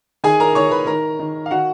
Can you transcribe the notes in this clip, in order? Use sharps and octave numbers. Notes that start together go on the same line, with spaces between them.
D#3 G#4 G#5
A#4 A#5
D#3 C#5 C#6
B4 B5
D#3 A#4 A#5
D#3
F5
D#3 F#4 F#5